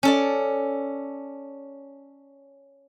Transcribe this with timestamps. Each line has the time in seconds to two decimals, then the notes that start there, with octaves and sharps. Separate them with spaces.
0.03 C#4 A4 D5